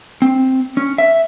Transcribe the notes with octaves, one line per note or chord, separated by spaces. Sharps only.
C4
C#4
E5